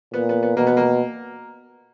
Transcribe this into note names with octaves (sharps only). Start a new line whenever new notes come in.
A#2 B3
B3
B3
B2 A#3
B3
A#3